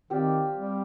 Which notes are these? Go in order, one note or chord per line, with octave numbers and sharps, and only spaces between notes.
D#3 C4 G4 D5 F5
G3